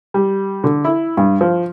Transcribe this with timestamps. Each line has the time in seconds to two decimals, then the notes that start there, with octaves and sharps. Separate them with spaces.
0.14 G3
0.64 D3
0.85 E4
1.17 G2
1.41 F3